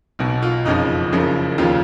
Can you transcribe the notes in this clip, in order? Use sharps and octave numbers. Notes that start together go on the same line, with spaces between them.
B1 B2
F4
F#1 F2 C#3 F3 D#4
F#1 F#2 C#3 F3
F1 D#2 C#3 F3 F4